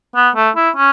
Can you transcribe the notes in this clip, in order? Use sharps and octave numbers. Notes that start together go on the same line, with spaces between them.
B3
A3
E4
C#4